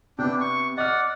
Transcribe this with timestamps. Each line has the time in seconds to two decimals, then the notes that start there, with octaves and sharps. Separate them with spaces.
0.19 C3 B3 D4 G5
0.41 C#6
0.77 D5 D#5 F#5 F6